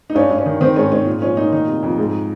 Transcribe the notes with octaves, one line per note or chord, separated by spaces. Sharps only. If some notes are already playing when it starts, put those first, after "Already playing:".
D#4
G2 C#4
G2
C#4
D#3
D#3 C4
G#2 C#4
G#2 C#4
A#2
F3 C#4
A#2 D#4
D#3 D#4
C3
F2
G#2